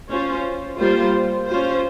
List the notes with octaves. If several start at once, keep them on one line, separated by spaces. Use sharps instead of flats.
C#4 F4 C5
G3 A#3 F4 C5
C#4 F4 C5